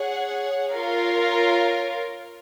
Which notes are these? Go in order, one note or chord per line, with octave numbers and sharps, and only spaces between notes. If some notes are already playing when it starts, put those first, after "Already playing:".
Already playing: G#4 C#5 F#5
F4 A#4 C#5 F5